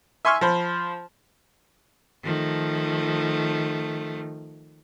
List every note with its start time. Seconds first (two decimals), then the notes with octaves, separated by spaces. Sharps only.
0.25 E5 G#5 C6 C#6 E6 F6
0.41 F3 C5 B5
2.23 D#3 F3 A3